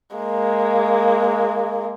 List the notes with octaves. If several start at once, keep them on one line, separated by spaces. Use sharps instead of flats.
G#3 A#3